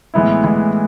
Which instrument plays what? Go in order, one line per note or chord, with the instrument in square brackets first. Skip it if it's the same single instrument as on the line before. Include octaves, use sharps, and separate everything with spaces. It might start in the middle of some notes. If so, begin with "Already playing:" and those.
[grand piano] A2 E3 G#3 B3 E4
A2 E3 G#3 B3 E4